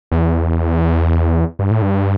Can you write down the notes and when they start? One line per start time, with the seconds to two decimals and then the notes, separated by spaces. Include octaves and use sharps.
0.11 E2
1.59 G2
1.71 A2
1.82 G2